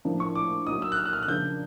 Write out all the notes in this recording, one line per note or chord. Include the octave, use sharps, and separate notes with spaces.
A2 F3 A#3 D4
C#6
D6
F#3 A#3 D#4 D#6
E6
F#6
F6
F#6
F6
F#6
C#3 F3 A#3 D4 G6